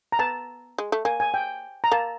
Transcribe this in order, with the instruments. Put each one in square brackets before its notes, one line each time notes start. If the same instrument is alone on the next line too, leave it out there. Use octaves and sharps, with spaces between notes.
[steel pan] A#5
[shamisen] B3 [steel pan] A5
[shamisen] G#3
A3
[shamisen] A#3 [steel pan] G#5
[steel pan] G#5
G5
A#5
[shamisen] A#3 [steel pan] A5